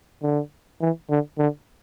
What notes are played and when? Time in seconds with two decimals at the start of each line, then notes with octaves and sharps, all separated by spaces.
0.22 D3
0.81 E3
1.10 D3
1.38 D3